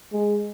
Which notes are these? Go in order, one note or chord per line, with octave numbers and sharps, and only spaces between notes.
G#3